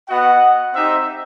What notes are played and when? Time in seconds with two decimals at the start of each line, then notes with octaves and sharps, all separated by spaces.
0.09 B3 F#4 D#5 F#5
0.74 C4 D#4 G4 C5 E5